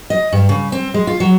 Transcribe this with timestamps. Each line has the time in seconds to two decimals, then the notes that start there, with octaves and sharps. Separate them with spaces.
0.10 D#5
0.32 G2
0.49 C#3
0.72 C4
0.94 G#3
1.07 F4
1.20 F#3